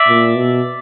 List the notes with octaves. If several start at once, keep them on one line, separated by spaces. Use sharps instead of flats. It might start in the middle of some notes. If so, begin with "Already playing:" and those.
Already playing: D5 E5
A#2
B2